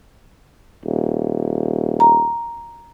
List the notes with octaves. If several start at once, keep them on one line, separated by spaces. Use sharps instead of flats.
D#1
A#5